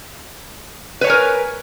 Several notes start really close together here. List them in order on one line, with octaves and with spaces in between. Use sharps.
B4 C#5 G#5 A#4